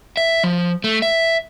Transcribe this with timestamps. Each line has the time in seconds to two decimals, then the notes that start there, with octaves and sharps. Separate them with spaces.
0.17 E5
0.43 F3
0.84 A3
1.02 E5